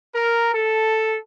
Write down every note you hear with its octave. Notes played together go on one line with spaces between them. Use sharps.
A#4
A4